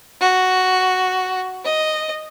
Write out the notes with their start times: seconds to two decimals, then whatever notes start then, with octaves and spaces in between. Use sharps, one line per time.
0.21 F#4
1.65 D#5